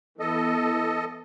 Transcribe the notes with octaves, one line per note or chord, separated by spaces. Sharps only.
E3 B3 A4 D#5